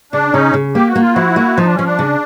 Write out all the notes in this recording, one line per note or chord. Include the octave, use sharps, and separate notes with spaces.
C#3 D4
C#3 C#4 D#4
C#3
A#3 G4
F#4
A#3
F4
F3 E4 F#4
A#3
F3 D#4
D4
F3 C#4
D4
C#3